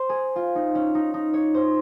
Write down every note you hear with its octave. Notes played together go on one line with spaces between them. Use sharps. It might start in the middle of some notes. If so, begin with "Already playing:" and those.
Already playing: C5
G#4
F4
D#4
C#4
D#4
D#4
C#5
C5